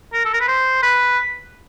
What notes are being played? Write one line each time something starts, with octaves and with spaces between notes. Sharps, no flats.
A#4
A4
A#4
B4
C5
B4